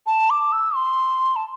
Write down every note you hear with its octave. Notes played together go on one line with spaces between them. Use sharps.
A5
D6
E6
C6
A5